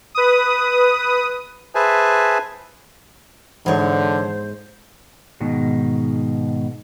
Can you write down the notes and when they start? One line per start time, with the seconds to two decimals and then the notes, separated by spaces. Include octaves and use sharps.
0.15 B4 D#6
1.75 G#4 B4 C5 E5 G#5 A5
3.66 G#2 D3 E3 B3 C5 C#5
5.40 G#2 B2 D#3